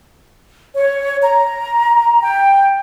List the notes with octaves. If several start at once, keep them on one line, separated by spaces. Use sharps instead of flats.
C#5
A#5
G5